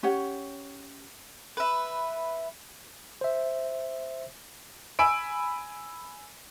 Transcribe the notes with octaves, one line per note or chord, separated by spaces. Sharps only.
C#4 G4 C#5 F#5
B4 E5
C5 E5
G#5 B5 E6 D7